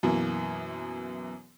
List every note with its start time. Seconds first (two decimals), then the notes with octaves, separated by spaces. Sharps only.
0.03 F#2 B2 E3 A#3